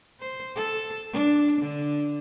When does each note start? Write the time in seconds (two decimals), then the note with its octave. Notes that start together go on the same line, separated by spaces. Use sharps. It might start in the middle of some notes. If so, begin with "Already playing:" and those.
0.20 C5
0.56 A4
1.13 D4
1.61 D3